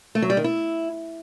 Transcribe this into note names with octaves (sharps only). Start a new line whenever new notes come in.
A3
F#3
G3
D#3
E4